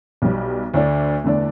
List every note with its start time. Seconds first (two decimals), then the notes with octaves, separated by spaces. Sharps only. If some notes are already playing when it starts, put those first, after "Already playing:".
0.22 B1 B2 G3
0.74 D2 D3 A3 D4
1.24 E2 D3 A3 D4